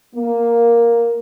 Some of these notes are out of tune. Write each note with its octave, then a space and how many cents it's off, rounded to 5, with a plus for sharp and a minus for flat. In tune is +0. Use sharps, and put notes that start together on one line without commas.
A#3 +5